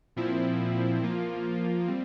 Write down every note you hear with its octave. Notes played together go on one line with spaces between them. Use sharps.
A#2 F3 C4 E4
F3 A#3 F4
G3 C4